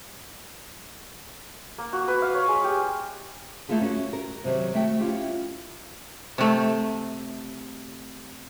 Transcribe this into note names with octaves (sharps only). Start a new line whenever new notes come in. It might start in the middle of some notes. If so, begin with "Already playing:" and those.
A#3
F#4
B4
F5
C#5
G#3
G4
A3 A#3 E4 F4 G#4
C#4 F#4
A#4
C3 D#3 F#3 G4
A3 F#4 E5 G5
C#4 E4 F4 G4
C3 A3